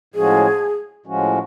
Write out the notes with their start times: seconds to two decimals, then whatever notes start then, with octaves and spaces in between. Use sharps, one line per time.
0.14 A2 F3 G#3 C#4 F#4 G#4
1.06 A2 F3 G#3 C#4 F#4